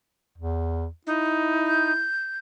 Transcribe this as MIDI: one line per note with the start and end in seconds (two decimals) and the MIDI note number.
0.38 0.87 40
1.07 1.92 63
1.07 2.06 64
1.66 2.38 91